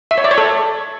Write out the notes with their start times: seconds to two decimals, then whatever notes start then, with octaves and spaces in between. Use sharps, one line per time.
0.11 E5
0.18 C#5
0.24 D5
0.31 C#5
0.38 A4